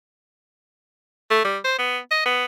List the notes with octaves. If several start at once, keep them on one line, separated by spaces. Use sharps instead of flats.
A3
G3
C5
B3
D#5
B3